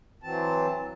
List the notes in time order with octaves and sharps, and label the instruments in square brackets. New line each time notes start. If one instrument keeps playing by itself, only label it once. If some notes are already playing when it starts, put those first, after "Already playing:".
[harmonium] E3 F#3 C4 A5